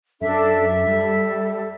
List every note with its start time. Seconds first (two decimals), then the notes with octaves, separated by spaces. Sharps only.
0.21 F#2 D4 A4 E5
0.87 G3 A4